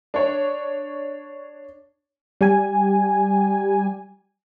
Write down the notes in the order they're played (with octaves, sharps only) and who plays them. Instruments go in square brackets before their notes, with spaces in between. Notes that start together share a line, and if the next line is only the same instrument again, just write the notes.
[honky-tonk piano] D4 C#5
[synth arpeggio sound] G3 G4 G#5